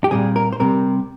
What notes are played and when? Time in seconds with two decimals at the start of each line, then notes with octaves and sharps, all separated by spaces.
0.04 G4
0.11 A#2 G3 C4 G#4
0.36 A#4
0.53 C5
0.60 C3 G3 C4 A#4